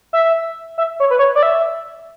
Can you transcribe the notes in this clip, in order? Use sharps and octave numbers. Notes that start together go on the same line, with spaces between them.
E5
E5
C#5
B4
C#5
D5
E5